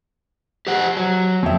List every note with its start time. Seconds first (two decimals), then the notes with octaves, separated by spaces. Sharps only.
0.67 G4 C5 F#5
0.97 F#3
1.43 F2 E5